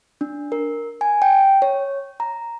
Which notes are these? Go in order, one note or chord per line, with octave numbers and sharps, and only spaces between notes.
D4
A#4
G#5
G5
C#5
A#5